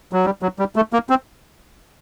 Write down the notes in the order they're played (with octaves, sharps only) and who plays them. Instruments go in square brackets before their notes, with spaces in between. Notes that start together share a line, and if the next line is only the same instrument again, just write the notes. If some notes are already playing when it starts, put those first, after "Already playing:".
[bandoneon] F#3
G3
F#3
G3
A3
A#3
C4